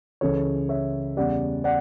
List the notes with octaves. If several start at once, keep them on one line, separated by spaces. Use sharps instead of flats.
C#2 C#3 E3 A4 C#5
C#5 E5
E2 C#3 G3 D5 F#5
D5 F#5